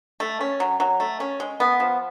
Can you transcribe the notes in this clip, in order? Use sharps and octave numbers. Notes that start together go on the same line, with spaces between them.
A3
C#4
F#3
F#3
A3
C#4
G#3
B3
F3